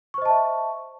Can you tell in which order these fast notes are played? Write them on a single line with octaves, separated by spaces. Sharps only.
C#6 C5 D#5 A5 E5